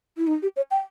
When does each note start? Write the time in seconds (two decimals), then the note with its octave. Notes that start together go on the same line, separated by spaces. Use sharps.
0.17 E4
0.27 D#4
0.43 G4
0.56 C#5
0.71 G5